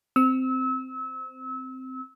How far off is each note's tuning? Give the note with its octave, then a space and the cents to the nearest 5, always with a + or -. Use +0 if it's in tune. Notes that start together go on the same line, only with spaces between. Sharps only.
C4 -10 E6 -30